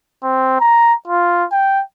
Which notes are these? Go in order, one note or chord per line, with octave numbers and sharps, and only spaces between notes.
C4
A#5
F4
G5